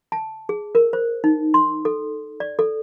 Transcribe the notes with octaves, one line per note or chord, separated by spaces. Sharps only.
A5
G#4
A#4
C5
D#4
C6
A4
D5
A4